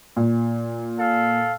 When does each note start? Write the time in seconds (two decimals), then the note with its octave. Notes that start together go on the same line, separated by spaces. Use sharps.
0.17 A#2
0.97 A4 F5